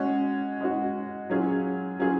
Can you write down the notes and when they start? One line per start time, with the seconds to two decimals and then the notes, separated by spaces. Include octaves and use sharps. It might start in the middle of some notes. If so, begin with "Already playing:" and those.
Already playing: G#3 C#4 F#4
0.61 G#3 C#4 F#4
1.30 F#3 C#4 F4 G#4
1.99 F#3 C#4 F4 G#4